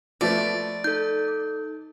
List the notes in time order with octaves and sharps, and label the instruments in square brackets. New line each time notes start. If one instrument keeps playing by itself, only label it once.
[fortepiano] F3 A3 B3 [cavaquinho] D5
[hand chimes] D#4 A4 [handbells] G6